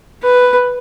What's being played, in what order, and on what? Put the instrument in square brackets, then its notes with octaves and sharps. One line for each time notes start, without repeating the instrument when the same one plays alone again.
[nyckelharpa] B4